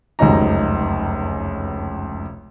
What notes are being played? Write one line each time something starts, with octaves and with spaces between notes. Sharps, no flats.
F1 C#2 F#2 D#4 A#5